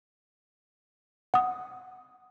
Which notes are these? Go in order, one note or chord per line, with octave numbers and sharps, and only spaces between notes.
F#5 D#6